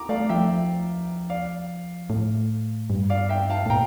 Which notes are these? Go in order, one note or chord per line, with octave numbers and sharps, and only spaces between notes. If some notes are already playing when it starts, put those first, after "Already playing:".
Already playing: A#5 D6
A3 D5 F5
F3 E5 G5
D5 F5
A2
G2
D5 F5
E5 G5
F5 A5
A2
A#2 G5 A#5